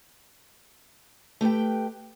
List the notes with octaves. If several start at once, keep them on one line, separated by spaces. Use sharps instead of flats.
A3 G4 B4 G5